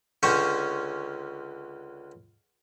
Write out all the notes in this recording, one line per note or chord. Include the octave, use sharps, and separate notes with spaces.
C#2 D3 C#4 C5 C#5